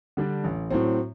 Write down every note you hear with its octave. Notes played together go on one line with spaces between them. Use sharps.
D3 G3 D4
A1
A2 F#3 C4